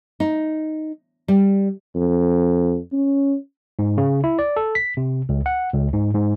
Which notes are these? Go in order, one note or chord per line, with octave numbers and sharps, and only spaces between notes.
D#4
G3
F2
C#4
G#2
C#3
E4
D5
A4
B6
C3
C#2
F#5
C#2
G#2
G#2